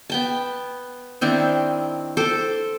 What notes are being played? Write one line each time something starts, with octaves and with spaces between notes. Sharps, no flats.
B3 G5 A5
D#3 C4 D4 E4
A4 C5 D6